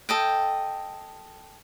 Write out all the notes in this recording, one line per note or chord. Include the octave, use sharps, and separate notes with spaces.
A4 D#5 G5